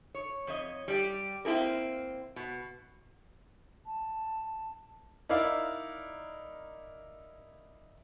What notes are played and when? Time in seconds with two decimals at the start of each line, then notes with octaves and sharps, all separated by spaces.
0.15 C#5
0.47 F2 C#5 D#5
0.88 G3 G4
1.45 A#3 C4 E4 G#4 A#4
2.36 B2
3.86 A5
5.29 D#4 E4 A#4 D5 E5 F5